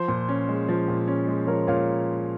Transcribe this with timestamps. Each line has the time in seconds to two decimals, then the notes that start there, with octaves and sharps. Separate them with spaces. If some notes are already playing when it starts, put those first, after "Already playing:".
Already playing: F3 C5
0.08 A#2
0.29 C#4
0.49 G#3
0.69 F3
0.88 A#2
1.08 C#4
1.27 G#3
1.47 F3 A#4 C#5
1.67 A#2 C#5 F5